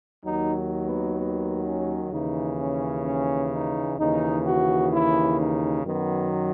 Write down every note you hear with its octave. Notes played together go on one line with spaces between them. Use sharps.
D#2 D#3 F#3 D#4
B3
B3
C#4
D#2 C#3 E3 D#4
C#4
C#4
D#4
D#2 C#3 E3 D#4
F#4
E4
D#4
F#2 D#3 F#3 B3